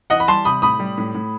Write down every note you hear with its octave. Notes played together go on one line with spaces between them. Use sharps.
E3 D#5 F#5
B5
G3 A5 C6
C3 B5 D#6
A2 B5 D#6
G3
A2
A2